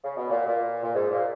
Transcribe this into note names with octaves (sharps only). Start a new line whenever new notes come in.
C#3
B2
A#2
A#2
A#2
G#2
A#2